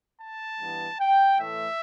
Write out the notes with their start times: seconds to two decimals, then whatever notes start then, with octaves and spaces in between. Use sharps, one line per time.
0.20 A5
0.60 G2 E3 B3
1.00 G5
1.39 A2 E3 A3 E5